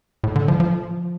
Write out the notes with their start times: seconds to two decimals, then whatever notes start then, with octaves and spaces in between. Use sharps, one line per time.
0.24 A2
0.35 D3
0.48 F3
0.60 F3